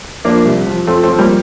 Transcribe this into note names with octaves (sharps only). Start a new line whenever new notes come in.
F3 A#3 D4
C2
F3
F3 A3 C4
A3 C4
F3
G3 A#3